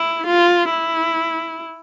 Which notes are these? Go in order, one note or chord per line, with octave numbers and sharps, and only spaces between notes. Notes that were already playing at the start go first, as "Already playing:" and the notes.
Already playing: E4
F4
E4